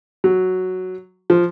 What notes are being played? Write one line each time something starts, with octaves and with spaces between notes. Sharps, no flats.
F#3
F3